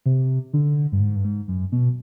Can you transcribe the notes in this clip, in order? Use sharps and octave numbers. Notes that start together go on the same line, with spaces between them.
C3
D3
G2
G#2
G2
G#2
F#2
B2